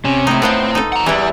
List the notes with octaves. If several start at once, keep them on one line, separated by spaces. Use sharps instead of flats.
C3 C#4
A2 D#4 E4
B3 C4 F4 C5
D#4 A4
F#5 A#5
E2 E3 G3 E4